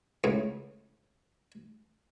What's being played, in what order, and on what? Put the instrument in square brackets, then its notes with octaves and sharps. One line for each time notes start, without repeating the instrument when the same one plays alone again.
[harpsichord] C#2 A2